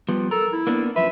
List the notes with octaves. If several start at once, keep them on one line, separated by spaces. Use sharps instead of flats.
F3 G3 B3
A4 A#4
E4
A#3 B3 D4
F#2 F3 B4 E5